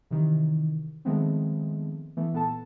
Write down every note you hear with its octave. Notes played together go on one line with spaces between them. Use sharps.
C3 D#3 E3
D#3 F3 G#3 A3 B3 C4
E3 A3 B3
A#2 B3 A4 A5